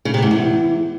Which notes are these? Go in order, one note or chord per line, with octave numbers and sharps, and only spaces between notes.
C#3
C3
G#2
E2